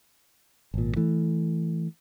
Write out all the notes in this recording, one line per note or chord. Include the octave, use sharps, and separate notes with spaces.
G#1 A#2
E3 A3